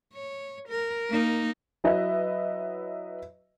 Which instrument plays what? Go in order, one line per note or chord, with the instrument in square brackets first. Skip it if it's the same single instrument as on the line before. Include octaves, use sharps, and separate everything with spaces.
[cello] C#5
A#4
A#3 D#4
[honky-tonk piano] F#3 E4 B4 D#5 E5